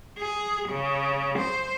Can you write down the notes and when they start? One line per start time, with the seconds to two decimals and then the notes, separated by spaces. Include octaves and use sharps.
0.19 G#4
0.69 C#3
1.39 C5